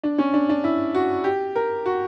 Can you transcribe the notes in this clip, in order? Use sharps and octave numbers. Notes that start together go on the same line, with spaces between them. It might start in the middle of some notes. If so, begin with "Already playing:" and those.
D4
C#4
D4
D4
E4
F#4
G4
A#4
F#4